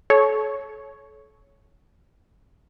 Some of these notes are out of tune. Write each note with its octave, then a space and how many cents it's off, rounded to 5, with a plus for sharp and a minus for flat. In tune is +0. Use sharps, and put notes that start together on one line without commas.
A4 -35 C#5 +0